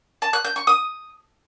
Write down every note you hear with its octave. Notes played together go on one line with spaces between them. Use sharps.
A5
F#6
G6
C#6
D#6